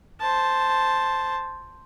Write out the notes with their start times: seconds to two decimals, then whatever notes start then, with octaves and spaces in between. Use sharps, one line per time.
0.20 C5 A5